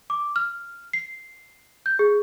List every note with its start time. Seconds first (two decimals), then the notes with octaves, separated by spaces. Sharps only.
0.10 D6
0.36 F6
0.93 C7
1.86 G6
1.99 G#4